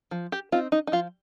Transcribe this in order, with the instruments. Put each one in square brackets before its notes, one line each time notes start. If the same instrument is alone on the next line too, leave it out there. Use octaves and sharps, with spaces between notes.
[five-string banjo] F3
G4
C4 D#4 F4
D#4
D#4
F3 F4